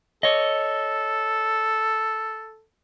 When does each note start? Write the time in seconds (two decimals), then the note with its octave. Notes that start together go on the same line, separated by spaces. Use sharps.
0.23 A4 C#5 D#5